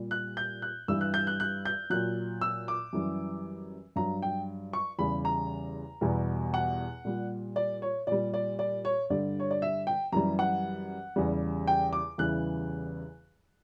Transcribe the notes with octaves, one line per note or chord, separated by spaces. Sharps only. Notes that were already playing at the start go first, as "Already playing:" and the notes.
Already playing: A#2 G3
F#6
G6
F#6
G2 E3 G3 E6
F#6
G6
F#6
F#6
G6
A#2 F#3 F#6
E6
D6
F#2 E3 G3
G2 F#3 A#5
G5
C#6
E2 C#3 G3 B5
A#5
E2 B2 G3
F#5
A#2 G3
D5
C#5
A#2 G3 D5
D5
D5
C#5
G2 D3 G3 D5
C#5
D5
E5
G5
F#2 E3 G3 A#5
F#5
E2 C#3 G3
G5
D6
E2 C#3 E3 G3 F#6